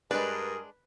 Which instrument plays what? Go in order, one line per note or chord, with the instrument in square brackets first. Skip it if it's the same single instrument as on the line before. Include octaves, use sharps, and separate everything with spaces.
[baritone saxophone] G2 [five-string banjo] G#3 D4 [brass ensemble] G#4 A#4 [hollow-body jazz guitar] B4